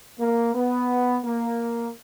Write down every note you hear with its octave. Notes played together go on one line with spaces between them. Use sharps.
A#3
B3
A#3